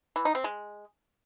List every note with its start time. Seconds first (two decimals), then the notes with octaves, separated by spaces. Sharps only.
0.16 E3
0.25 D#4
0.35 C4
0.44 G#3